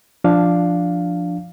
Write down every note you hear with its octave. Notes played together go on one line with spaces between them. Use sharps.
F3 D4 F5